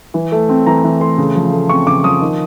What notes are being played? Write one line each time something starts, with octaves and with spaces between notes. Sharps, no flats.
E3
A3
C4
E3 A#5
E3
A3 C6
C#3
F3
A3
C4 C#6
C#3 D6
F3 D#6
D#3